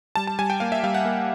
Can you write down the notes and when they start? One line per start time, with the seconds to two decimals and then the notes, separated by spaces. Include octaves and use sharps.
0.16 G3 A5
0.27 A5
0.39 G3 G#5
0.50 G5
0.60 A#3 F5
0.72 E5
0.83 G3 F5
0.94 F#5
1.05 A#3